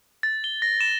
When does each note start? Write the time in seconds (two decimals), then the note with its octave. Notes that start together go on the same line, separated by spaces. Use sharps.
0.23 A6
0.44 G7
0.62 A#6
0.81 E7